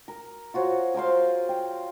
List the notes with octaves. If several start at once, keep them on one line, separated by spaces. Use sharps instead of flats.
A#4
F4 F#4 C5 C#5
G#4 A#4 C5 F5
G5